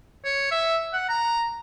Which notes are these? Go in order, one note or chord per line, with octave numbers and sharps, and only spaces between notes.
C#5
E5
F#5
A#5